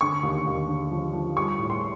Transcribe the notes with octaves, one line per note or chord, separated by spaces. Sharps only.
D3 C#6
D#2
D#2
D3
F3
F3
G3 C#6
A2
C6